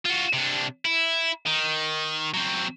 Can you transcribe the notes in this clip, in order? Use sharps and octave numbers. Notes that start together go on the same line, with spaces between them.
F4 F#4
C3 D4
E4
D#3
F#3 C4